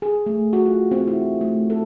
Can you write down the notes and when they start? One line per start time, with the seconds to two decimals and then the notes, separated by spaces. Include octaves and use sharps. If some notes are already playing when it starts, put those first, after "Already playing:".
0.02 G#4
0.26 A3
0.53 F#4
0.66 F4
0.91 C4
1.08 E4
1.41 A3
1.70 A4